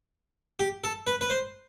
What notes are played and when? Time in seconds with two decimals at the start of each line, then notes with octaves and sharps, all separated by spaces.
0.59 G4
0.84 A4
1.07 B4
1.21 B4
1.30 C5